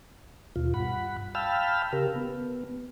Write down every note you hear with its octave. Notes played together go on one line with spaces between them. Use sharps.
D#2 B2 F4
G2 F#5 B5
F5 G5 A5 B5 E6 F6
C#3 G4 A#4
B3